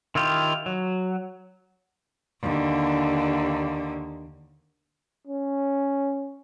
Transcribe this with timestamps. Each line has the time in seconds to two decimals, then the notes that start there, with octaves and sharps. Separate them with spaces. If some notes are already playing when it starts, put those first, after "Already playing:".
0.15 D#3 E4 F4 G4
0.66 F#3
2.42 D#2 D3
5.27 C#4